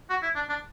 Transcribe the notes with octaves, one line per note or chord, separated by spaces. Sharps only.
F#4
E4
D4
D4